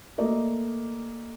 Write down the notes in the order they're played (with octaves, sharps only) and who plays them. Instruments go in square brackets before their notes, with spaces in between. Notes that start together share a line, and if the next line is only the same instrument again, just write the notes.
[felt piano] A3 A#3 D5 D#5